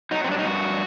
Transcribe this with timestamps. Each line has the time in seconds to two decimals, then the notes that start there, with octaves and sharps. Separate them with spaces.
0.11 F#3 D#4
0.24 C4
0.29 G2 D4
0.39 D#4
0.45 G2 F#4
0.62 F#3